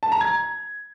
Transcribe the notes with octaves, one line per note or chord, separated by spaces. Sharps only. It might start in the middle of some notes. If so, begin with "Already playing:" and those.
A5
A#5
G#6